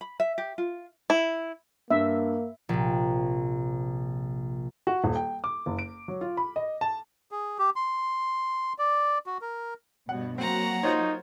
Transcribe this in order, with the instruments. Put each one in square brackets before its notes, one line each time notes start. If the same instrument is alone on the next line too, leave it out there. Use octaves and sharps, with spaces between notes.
[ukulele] B5
E5
G4
F4
[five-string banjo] E4
[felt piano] G2 [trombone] A#3 [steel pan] E5
[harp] A#1 C3
[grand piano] F#4
D#1
G5
D6
F#1
D7
F#3
F4
B5
D#5
A5
[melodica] G#4
G4
C6
D5
F#4
A#4
[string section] G2 B2 [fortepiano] F#5
[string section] F#3 A#3 F#4 [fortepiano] C4 [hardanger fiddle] F#5 A#5
[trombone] D#4 [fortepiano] F4 C5 C#5